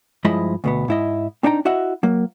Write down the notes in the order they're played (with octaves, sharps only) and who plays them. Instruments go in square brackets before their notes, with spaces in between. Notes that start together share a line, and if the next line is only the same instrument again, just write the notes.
[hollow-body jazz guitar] G2 F3 G#3 E4 D#5 B5
D2 B2 B3
G#2 E4 D#5
C4 D4 D#4 G5 A#5
E4 F#4 D#5 E5 F#5
F#3 A#3